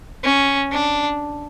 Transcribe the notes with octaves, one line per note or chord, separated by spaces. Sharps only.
C#4
D4